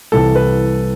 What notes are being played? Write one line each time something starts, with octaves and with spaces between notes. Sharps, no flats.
C2 C3 E3 A4
B4